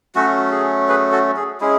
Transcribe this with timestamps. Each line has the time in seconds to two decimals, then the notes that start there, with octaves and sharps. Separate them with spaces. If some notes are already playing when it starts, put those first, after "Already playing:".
0.15 F#3 A3 C#4 F#4
0.51 G#4
0.88 G#4 B4
1.12 F#4 A4
1.36 G#4
1.61 G#3 C#4 E4 G#4